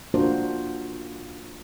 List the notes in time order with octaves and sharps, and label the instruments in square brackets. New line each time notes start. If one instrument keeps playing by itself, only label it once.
[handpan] A#3 D4 F4 F#4 A#4 C5